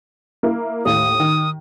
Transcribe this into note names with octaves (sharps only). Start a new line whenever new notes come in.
A#3 E4
D#2 A2 F5 D#6
D#3